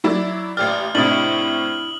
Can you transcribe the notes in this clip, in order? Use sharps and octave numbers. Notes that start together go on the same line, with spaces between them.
F#3 E4 D5
A1 G4 D5 F6
A2 C3 D4 E4 D#6 F#7